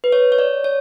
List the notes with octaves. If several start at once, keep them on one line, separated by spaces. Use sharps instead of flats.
B4
C#5
C#5
D5
C#5